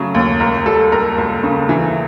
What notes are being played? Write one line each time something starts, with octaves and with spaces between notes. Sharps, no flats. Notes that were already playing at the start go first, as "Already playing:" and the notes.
Already playing: C#3 F#3 A3
D#2
C#2 A#4
G3 A4
C#2 A#4
C#2
C#3
E3